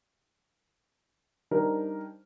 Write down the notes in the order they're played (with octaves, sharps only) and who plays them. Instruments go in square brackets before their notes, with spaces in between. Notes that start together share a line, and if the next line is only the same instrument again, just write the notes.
[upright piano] G3 D4 D#4 A#4 C5